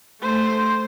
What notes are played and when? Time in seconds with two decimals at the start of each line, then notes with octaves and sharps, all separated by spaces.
0.22 A3 C5